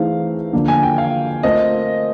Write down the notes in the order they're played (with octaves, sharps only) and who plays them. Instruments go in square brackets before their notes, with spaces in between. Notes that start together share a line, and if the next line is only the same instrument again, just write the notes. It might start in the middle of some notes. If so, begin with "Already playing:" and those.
Already playing: [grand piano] E3 A3 C4 D#4 G#4 [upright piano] F5
[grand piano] D3 F3 A#3 D4
[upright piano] G#5
G5
F5
[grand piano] A3 C4 F4 A#4 [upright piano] D#5